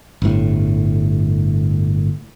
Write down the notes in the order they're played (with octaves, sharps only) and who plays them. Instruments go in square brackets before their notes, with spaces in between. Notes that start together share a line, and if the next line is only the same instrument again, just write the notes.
[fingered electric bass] G1 A2